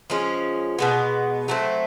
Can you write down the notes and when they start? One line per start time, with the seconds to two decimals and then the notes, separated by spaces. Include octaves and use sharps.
0.10 F3 G#3 C#4
0.79 B2 G#3 B3
1.48 F#3 A3 C4